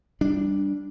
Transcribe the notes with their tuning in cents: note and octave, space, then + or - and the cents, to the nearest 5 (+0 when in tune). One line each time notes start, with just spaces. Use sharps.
G3 +0 D4 -5